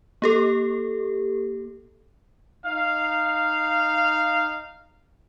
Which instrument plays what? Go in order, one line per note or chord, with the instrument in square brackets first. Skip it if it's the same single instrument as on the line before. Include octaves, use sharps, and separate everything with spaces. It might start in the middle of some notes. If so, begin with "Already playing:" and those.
[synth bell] A#3 G4 A4
[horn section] D#4 F5